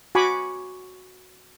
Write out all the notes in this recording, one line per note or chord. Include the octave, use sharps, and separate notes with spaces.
F#4 G#5 B5 C#6 D6